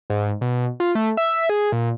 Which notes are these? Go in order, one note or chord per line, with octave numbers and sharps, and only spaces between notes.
G#2
B2
F4
A3
E5
G#4
A#2